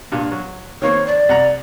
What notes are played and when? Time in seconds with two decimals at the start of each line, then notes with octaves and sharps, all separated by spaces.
0.12 G2 A#2
0.32 F#3
0.82 D#3 A#3 C4 C#5
1.07 D5
1.29 C2 F#5 A#5